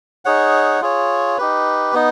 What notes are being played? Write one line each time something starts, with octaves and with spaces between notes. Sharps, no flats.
D#4 G#4 C#5 F#5
F4 G#4 C#5
D#4 G4 B4
B3 D#4